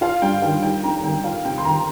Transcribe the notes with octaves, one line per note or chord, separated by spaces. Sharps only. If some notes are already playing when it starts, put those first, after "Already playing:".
F4 F5
G2 G5
D#3 F5
D#4 G5
F2 A#5
D#3 G5
F4 F5
C3 G5
C6
D#3 A#5